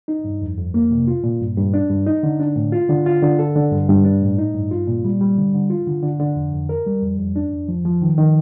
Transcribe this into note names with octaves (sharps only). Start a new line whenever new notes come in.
D#4
G2
F2
F2
A#3
C3
F4
A#2
G2
G2
D4
G2
D#4
D3
D4
A2
F4
D3
F4
D3
A4
D3
G2
G2
D4
A2
D#4
G2
F4
A#2
G3
G3
D3
D3
F4
D3
D3
D3
F2
F2
A#4
G3
F2
F2
D4
F2
F3
F3
D#3
D#3